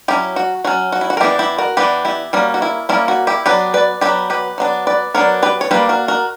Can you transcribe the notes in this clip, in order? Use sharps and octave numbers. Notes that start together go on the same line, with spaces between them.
F#3 C#4 E4 G4
F#4
F#3 C#4 F#4
F#4
E4
F#4
A#4
E3 B3 D4 E4 G4
E4 G4
F#4 A#4
E3 B3 D4 G4 B4
E4 G4
G3 A#3 C#4 F#4
F#4
E4
G3 A#3 C#4 E4
F#4
E4 G4
F#3 B3 D4 G4 B4
B4 D5
F#3 B3 D4 G4 B4
G4 B4
F#3 B3 D4
B4 D5
F#3 B3 D4 A#4 C#5
G4 B4
C#5
G3 A#3 D4 G4 B4
F#4 A#4
F#4 A#4